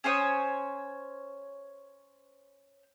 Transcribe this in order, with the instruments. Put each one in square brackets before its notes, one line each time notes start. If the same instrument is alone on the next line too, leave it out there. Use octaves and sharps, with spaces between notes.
[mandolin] C#4 C5 C#5 D#6